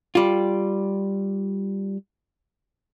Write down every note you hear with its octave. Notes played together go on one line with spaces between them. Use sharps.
G3 F4